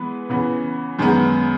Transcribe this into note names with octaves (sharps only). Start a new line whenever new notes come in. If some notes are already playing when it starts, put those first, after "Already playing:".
Already playing: E3 G#3 B3 B4
C#3 E3 B3
F#2 D#3 G#3 B3